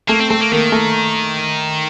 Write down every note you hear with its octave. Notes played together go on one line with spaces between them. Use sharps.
A3 A#3
C4
A3 C4
A#3
D#3 A#3
A3